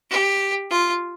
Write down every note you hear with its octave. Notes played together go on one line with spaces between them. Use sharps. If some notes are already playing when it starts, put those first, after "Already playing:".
G4
F4